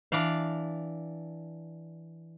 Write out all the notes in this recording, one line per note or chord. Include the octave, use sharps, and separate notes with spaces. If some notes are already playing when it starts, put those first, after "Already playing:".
E3 D4 D5 F5